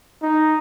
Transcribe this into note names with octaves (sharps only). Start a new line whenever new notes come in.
D#4